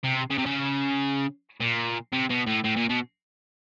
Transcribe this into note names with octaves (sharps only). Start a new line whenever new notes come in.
C3
C#3
C3
C#3
A#2
C3
B2
A2
A2
A#2
B2